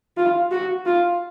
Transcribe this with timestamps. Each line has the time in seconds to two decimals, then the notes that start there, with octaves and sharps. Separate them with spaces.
0.17 F4
0.52 F#4
0.86 F4